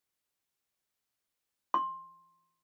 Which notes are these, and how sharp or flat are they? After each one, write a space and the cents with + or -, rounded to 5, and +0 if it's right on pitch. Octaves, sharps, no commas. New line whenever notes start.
C6 +20